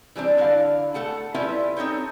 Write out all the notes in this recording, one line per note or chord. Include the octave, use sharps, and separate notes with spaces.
E3 G3 C4 D4
D3 D4 E4 D5 F5
A3 A4 F#5 A5
G3 C#4 E4 F4 B4 E5
C4 D#4 A4 C#5 G5